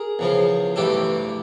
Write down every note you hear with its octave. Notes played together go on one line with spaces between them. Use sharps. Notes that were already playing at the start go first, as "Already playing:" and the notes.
Already playing: G#4 A#4
E2 C#3 F3
A1 G2 E3 G4 A4